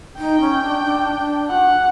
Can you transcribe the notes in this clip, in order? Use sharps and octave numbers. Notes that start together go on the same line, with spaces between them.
D#4 G5
C#4
D4
D4
D4
F#4 F#5